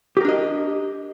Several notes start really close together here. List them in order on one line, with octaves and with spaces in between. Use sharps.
G4 A#4 D4 D#5